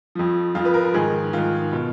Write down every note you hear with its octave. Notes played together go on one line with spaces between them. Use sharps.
F2 F3
F2 F3 F4
B4
A#4
A#4
G#2 D#3 G#4
G#2 D#3 F4
B2